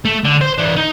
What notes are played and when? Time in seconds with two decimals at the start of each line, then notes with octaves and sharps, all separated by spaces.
0.05 A3
0.24 D3
0.41 C5
0.58 E3 D4
0.76 D#4